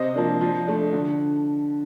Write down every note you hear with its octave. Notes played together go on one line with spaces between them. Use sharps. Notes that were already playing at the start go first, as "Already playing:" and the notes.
Already playing: C3 C5 D#5
F3 A#3 D4
F3
A3 D4
D3